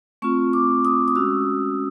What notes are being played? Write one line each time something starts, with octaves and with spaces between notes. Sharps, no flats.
A3 C4 F4 C#6
D6
D#6
D#6
G#3 C#4 F#4 E6